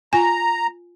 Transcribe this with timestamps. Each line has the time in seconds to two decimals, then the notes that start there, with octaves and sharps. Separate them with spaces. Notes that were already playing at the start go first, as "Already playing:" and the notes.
0.13 F4 G#5 A#5